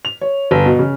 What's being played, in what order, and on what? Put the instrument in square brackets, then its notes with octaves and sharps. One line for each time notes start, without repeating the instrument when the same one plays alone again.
[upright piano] F7
C#5
G1
B2
C#3